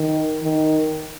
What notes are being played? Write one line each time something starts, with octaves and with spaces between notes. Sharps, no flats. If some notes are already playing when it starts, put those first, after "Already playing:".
Already playing: D#3
D#3